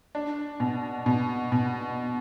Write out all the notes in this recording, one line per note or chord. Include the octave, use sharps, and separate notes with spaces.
D4
B2
B2
B2